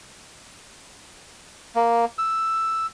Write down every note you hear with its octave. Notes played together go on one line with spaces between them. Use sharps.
A#3
E6